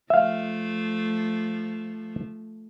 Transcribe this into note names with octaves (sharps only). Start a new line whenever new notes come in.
F3 A3 E5 F5